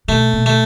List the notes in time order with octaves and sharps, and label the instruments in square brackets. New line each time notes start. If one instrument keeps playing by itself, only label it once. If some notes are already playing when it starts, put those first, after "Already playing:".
[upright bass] B2 [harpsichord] A3
[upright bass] B2
[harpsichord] A3